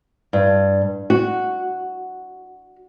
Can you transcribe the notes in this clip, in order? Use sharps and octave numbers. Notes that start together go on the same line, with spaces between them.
G2
F#4